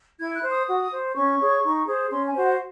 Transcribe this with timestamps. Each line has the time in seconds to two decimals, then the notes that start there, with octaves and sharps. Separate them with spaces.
0.18 E4 G#6
0.34 F#6
0.42 C5
0.50 D#6
0.66 F#4
0.91 C5
1.15 C#4 C#6
1.39 G#4 C#5
1.63 D#4
1.87 G#4 C5
2.10 C#4 C6
2.26 G#5
2.34 F#4 C5
2.43 F#5